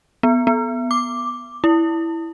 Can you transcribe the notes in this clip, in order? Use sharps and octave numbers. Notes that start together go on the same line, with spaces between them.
B3
B3
D6
E4